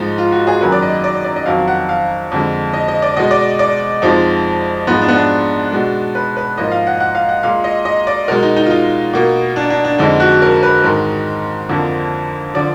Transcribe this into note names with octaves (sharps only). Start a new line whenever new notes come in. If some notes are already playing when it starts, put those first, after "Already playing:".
Already playing: G#2 F3 G#3 D#4
F4
F#4
G#4
F#2 D#3 F#3 A#3 B4
D5
D#5
D5
D5
D#5
F2 D#3 F#3 F5
F#5
F5
F2 D3 G#3
D#5
D#5
D5
B2 G#3 D#5
D5
D5
F2 F3 G#3 D#4
G#2 F3 G#3 B3
D4
B3
D4
B2 G#3
B4
B4
G#2 F3 A#3 D#5
F5
F#5
F#5
F5
F#5
A#2 G#3 F5
D#5
D#5
D5
B2 G#3 A#4
D#4
D#4
F4
D#4
B2 A#3
D4
D4
D4
F2 D3 G#3 D#4
F#4
A#4
B4
G#2 D#3 G#3 A#4
F2 D3 F3 A#3
D3 F3 D5